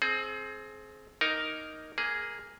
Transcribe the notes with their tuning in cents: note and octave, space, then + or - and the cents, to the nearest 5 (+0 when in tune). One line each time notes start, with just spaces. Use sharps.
C4 +10 G#4 +30
A#3 +5 D#4 +0 A#4 +0
A#3 +0 G#4 +0